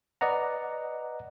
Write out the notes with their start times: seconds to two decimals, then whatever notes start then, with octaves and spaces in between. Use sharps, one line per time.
0.21 B4 D5 D#5 F#5 A#5